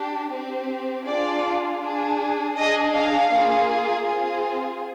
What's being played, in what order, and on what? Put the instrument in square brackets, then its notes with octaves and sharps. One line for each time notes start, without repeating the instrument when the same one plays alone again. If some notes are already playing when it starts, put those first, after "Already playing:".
Already playing: [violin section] D4 G4
C4 G4
D4 F4 G#4 D5
D4 G#4
D4 G#4 D#5
F5
A#3 F4 G#4
C4 F4 G#4